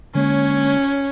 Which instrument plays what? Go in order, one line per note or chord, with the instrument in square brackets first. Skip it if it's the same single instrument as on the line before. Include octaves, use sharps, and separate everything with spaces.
[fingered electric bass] D3 G#3 A#3 [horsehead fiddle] C#4 C#5